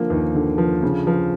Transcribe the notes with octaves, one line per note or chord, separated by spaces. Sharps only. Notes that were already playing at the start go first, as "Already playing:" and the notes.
Already playing: D3 F3 A#3
D#2
D3
F3
C#3
F3